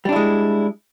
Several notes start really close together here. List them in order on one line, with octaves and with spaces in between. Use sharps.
G3 D4 E4 G#3